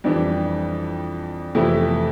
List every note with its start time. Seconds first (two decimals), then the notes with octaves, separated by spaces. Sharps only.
0.04 F2 E3 G3 D4
1.55 F2 C3 E3 A3 E4